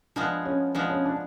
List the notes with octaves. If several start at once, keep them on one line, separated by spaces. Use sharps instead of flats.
F3 G#3 B3 D4
C#4
F3 G#3 B3 D4
C#4
D4